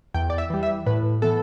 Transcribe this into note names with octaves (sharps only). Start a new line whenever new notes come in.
E2 G5
D5
E5
E3 G3
E5
A2 B4
E3 B3 A4